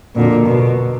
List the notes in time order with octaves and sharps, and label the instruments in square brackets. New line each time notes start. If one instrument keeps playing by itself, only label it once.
[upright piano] F2 D3 F#3 A#3 [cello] A#2
[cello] B2